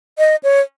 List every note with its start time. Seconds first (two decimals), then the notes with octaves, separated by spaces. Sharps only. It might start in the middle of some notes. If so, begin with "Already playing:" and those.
0.18 D#5
0.43 C#5